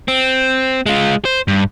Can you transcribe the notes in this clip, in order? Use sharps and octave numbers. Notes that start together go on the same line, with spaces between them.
C4
G#3 F4
C5
G2